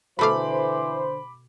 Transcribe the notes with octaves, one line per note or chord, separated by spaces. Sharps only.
B2 D3 E3 A3 C5 F5 B5 D6